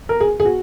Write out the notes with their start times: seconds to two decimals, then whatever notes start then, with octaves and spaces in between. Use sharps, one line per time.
0.09 A#4
0.20 G#4
0.40 G#4
0.45 F#4